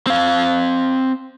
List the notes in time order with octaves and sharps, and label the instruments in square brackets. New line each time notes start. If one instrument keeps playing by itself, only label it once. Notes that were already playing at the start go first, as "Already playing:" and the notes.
[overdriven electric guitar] C4 F5